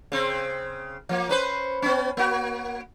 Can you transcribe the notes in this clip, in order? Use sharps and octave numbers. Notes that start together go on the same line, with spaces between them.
C#3 C4
F3 A#3
C#4 B4 C5
B3 C#4
A#3 F#4